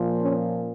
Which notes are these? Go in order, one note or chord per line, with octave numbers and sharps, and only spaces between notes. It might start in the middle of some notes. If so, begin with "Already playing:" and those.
Already playing: A#2 F3
C#4